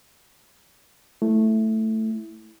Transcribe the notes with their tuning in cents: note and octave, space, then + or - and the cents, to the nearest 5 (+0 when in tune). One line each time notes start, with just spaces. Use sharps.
A3 +0 E4 +0